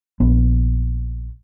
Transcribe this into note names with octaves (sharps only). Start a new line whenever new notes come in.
A#1 B3